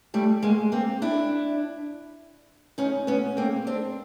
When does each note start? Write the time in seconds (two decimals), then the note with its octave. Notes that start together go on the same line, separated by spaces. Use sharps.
0.14 G3 A3
0.43 G#3 A#3
0.72 A#3 C4
1.02 D4 E4
2.78 C#4 D#4
3.07 B3 C#4
3.37 A#3 C4
3.67 C4 D4